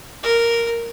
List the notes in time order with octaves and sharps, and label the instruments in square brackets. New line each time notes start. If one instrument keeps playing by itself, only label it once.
[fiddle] A#4